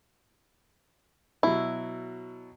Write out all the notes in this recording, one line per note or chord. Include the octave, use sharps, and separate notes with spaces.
B2 F#3 E4